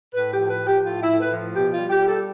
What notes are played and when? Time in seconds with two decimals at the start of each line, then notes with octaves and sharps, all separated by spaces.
0.13 A2 B4
0.32 F3 G4
0.49 B4
0.60 F3
0.66 G4
0.84 A2 F4
1.01 E4
1.07 A2
1.19 B4
1.30 F3
1.54 B2 G4
1.72 F4
1.77 G3
1.89 G4
2.00 G3
2.07 A4